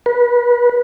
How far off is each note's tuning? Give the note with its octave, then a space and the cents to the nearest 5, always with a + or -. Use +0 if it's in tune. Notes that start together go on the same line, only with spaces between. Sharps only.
B4 -25